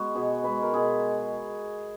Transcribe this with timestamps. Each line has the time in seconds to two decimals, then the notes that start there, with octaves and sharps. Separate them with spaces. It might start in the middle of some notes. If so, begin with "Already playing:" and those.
Already playing: G#3 B3 F#4
0.15 B2 G#4
0.44 G#3 B3 B4
0.62 A#4
0.73 B2 G#4